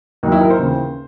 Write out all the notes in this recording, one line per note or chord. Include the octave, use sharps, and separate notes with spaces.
D#2 D#3 F#3 D#4
E4
A#4
C5
D#2 C#3 E3